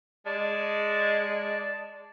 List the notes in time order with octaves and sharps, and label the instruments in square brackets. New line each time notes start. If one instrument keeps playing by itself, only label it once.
[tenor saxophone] G#3 [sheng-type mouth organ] D5 A5